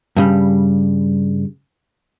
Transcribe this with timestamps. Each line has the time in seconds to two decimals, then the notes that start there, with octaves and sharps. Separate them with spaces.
0.16 G2 C#3 G3